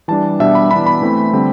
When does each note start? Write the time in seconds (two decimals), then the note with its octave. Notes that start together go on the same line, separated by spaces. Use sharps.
0.08 E3 G3 D4 A5
0.40 B2 G3 D4 E5
0.55 B5
0.71 E3 B3 D4 B5
0.86 B5
1.02 E3 A3 C4
1.33 D3 G3 C4